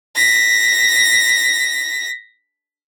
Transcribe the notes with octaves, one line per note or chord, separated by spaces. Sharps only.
A#6 B6